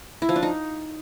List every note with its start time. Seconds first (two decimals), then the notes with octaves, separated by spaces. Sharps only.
0.22 E4
0.29 F3
0.36 D4
0.43 D#4